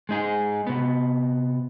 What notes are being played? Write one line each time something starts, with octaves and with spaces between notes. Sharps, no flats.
G#3 D#4 G#4
C3 B3